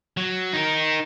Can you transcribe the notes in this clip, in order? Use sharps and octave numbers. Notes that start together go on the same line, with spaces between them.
F#3
D#4 A#4